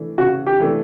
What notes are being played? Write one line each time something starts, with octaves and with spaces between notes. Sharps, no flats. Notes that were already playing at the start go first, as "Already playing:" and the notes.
Already playing: E3 A3 D4
C#3 F#4
G4
E3 A3 D4